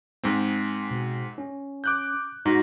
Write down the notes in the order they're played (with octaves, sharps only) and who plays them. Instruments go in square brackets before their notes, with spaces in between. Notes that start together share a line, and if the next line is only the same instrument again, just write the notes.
[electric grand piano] G#2 G#3 C4
[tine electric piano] B2
C#4
[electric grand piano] D6 F#6 G6
[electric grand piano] G#2 [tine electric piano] D#4 F#4 A#6